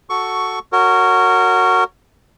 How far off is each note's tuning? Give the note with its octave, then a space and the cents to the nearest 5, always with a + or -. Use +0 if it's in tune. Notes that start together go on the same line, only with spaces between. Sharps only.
F#4 +0 A4 +0 C#6 +10
F#4 +0 A#4 -25 C#5 +0